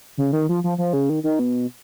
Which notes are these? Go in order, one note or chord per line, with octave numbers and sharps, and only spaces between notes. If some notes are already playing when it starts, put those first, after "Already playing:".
C#3
D#3
F3
F3
F3
C#3
D#3
D#3
B2